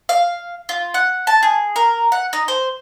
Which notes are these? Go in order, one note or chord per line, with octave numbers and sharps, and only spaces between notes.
F5
F4
F#5
A5
G#4
A#4
F#5
D#4
C5